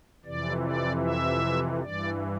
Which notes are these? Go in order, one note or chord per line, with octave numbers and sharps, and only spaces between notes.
F2 C3 E3 D5
D5
E5
G2 E3 D5